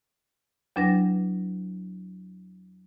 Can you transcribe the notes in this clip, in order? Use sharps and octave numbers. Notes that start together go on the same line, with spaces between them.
E2 F#3 D4 B4 A#6